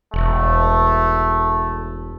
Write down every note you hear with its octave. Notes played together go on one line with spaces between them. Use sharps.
E1 A3